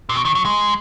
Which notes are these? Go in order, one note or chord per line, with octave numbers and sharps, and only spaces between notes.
A#2
B2
D#3
F#3
G#3